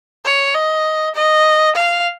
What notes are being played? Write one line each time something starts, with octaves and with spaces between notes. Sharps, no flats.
C#5
D#5
D#5
F5